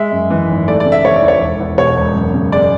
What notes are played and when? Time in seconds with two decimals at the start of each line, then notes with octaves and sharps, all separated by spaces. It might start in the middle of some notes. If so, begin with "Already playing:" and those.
Already playing: G#3 E5
0.12 F#2
0.30 E3
0.49 G#1
0.68 A3 D5
0.80 D5
0.86 C#3
0.92 E5
1.04 E3 C#5
1.16 D5
1.22 E2
1.28 C#5
1.41 E1
1.60 E2
1.78 B2 C#5
1.96 E1
2.15 F#2
2.34 C#3
2.52 G#3 D5